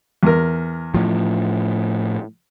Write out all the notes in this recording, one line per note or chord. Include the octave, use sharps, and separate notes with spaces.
E2 A#4
A2 F3